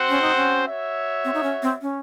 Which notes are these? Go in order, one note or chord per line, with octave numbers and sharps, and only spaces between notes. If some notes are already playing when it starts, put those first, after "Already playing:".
Already playing: C4 F#4 C5 F#5
C#4
D#4
C#4
F#4 C#5 E5
C4
D#4
C#4
C4
C#4